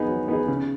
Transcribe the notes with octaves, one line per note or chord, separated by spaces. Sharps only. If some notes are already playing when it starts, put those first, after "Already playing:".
Already playing: B3 D#4 G#4
F#3
B3 D#4 G#4
C#3